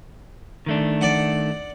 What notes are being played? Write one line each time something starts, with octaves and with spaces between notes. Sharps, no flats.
D#3 A3 D4
D5 F#5